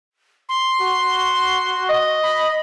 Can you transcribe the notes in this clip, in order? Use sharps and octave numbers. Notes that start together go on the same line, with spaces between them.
C6
F#4
D#5
B5